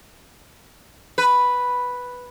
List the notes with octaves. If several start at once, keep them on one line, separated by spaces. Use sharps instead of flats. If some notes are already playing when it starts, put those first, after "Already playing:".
B4